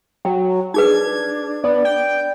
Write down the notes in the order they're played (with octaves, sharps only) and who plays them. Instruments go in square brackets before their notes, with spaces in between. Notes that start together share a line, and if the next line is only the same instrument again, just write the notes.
[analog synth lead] F#3 [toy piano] G5
[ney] D4 [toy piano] D#4 G#4 B4 [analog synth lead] G#6
[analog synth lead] B3 [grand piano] D5
[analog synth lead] G5